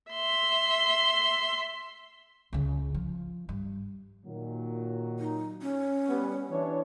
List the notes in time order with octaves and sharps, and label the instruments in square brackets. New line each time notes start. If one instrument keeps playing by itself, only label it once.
[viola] E5 C6
[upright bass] C#2 C#3
F3
G2
[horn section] A#2 D#3 F#3
[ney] D#4
C#4
[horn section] G3 B3
E3 D4 C#5